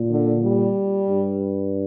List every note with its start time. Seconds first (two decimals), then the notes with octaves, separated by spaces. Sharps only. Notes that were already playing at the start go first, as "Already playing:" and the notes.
Already playing: A#2
0.10 D3
0.43 G3
1.09 G2